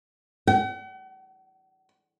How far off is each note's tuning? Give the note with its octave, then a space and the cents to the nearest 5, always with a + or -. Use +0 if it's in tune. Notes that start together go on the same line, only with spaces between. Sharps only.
F#5 +45